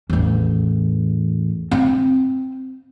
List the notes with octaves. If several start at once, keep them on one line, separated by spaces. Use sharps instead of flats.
A1 E2
C4